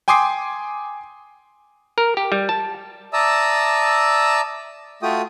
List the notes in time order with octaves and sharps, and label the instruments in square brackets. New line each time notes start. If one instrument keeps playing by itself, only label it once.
[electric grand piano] G5 G#5 C6 D6 D#6 C7
[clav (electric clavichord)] A#4
G4
G3
A5
[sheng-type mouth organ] D5 E5 A5 A#5 D#6 E6
A3 F4 F#4 G5 D#6